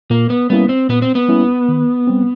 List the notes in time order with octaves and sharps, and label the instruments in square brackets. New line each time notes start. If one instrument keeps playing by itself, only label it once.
[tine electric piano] A#2 [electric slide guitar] A#3
[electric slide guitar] B3
[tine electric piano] G3 A#3 C#4 E4 [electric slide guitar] B3
[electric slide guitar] C4
[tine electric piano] A#2 [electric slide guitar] B3
[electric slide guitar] C4
B3
[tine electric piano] G3 A#3 C#4 E4
D#3
G3 C4